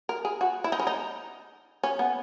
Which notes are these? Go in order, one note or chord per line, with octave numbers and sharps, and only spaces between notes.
A#4
G#4
F#4
E4
D#4
C#4
D#4
C#4
B3